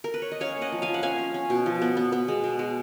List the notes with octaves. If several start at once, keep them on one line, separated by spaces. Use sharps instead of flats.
A#4
B4
C#5
D#5
C#4 C#5 F5
A#3
D#5 F#5
F3
F5 G#5
F3
F#5
C#4 F5 G#5
C#4
C#4
B2
F3
B3
B3
B3
G#3
B2
G#3